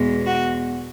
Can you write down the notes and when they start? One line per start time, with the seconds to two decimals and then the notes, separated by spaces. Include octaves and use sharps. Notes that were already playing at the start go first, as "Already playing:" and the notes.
Already playing: E2 B2 G#3
0.26 F#4